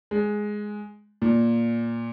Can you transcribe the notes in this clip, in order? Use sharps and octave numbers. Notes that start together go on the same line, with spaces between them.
G#3
A#2